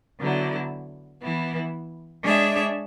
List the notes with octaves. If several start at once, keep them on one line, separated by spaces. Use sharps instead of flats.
D3 F#3 B3 E4
E3 B3 E4
G#3 D4 G#4 C#5 E5